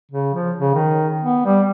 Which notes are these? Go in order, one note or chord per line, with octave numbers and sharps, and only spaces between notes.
C#3
F3
C#3
D#3
B3
G3